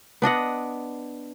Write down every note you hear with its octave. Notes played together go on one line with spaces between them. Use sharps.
B3 D4 D#5 F#5